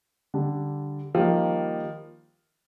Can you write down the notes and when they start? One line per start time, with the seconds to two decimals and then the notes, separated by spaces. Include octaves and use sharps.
0.34 D3 G3 D4
1.15 D#3 F3 G3 A#3